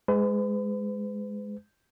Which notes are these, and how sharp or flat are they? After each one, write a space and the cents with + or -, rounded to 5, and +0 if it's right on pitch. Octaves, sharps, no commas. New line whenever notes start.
G#3 +0 B4 +45